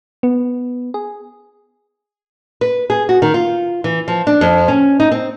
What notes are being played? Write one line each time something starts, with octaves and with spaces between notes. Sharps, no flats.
B3
G#4
B4
G#4
F#4
D#3
F4
E3
F3
D4
F2
C#4
D#4
C4